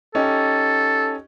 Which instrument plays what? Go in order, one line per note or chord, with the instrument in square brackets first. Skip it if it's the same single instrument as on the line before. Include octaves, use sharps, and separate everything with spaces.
[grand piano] C#4 D#4 G4 [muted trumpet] A4